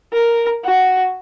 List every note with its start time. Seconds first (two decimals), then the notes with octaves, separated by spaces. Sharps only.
0.13 A#4
0.64 F#4